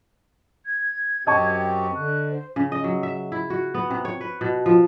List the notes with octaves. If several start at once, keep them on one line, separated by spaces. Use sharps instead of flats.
G#6
F#2 C4 G4 D#5 A5 C#6
D3 F#6
C5
C#3
D#5
F#3
E5
E4
F#4
B3
C3
C#5
B4
B2
F3